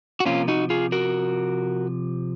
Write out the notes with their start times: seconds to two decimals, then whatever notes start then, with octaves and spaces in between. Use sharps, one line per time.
0.20 F#4
0.25 C3 F3 A#3 C#4 F4
0.48 D#4 F#4
0.70 F4 G#4
0.92 F#4 A#4